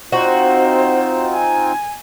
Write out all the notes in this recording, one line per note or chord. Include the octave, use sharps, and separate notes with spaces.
C4 D#4 F4 F#4 C5
G#5